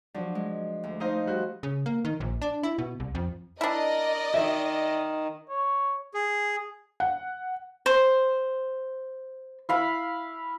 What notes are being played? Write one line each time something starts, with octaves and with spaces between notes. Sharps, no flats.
F3 F#3 D4
G#3
D2
A3 D#4 C5 D#5 F5
G3 F#4 C5
C#3
A#3
D#3
A#1
D4
E4
B2
C2
F2
D4 E4 A#4 D5 D#5
D#3 E5
C#5
G#4
F#5
C5
E4 F5 B5